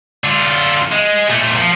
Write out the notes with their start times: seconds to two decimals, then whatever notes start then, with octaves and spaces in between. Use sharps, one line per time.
0.24 D3 F4
0.92 G#3
1.30 A#2 A3
1.57 F3